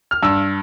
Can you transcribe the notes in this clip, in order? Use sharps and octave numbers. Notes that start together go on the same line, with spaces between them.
F6
G2 E6